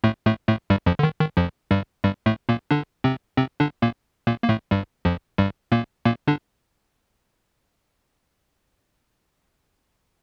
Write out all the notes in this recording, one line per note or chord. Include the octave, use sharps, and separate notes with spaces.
A2 A3
A2 A3
A2 A3
G2 G3
F2 F3
D3
D#3
D#3
F2 F3
G2 G3
G2 G3
A2 A3
A#2 A#3
D3 D4
C3 C4
C3 C4
D3 D4
A#2 A#3
A#2 A#3
A#3
A2 A3
G2 G3
F2 F3
G2 G3
A#2 A#3
A#2 A#3
D3 D4